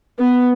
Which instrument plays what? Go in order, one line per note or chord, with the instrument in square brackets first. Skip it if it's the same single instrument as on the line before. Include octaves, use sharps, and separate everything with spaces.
[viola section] B3